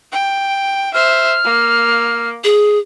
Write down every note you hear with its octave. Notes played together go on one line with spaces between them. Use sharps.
G5
C5 E5 F6
A#3
G#4